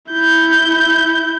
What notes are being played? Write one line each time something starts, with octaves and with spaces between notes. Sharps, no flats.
E4 G6